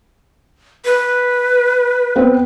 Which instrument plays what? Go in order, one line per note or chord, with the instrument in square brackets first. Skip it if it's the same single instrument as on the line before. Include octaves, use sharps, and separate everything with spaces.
[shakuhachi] B4
[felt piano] B3 C4